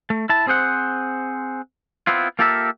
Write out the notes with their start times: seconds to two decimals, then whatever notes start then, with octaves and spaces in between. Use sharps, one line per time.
0.10 A3
0.29 E4 A5
0.47 C4 G#4 C5 F#5
2.07 B3 C4 E4 F4
2.39 A#3 F4 G4 A4 A#4 E5